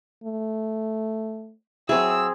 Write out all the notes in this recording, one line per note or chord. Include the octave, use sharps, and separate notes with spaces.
A3
F#3 C4 E4 G#4 E6